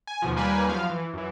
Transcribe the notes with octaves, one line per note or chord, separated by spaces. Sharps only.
G#5
D#2 B2 F3
D#2 G3 A#3 B4 G#5
F#2 F3 F5
E3
F#2 E3